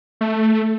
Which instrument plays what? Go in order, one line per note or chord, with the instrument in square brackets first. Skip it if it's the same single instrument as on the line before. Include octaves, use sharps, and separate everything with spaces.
[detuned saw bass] A3